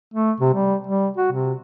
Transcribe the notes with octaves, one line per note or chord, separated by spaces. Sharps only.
A3
C3
G3
G3
F#4
C3